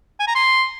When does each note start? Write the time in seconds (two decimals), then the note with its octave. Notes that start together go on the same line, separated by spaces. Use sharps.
0.20 G#5
0.27 A#5
0.35 C6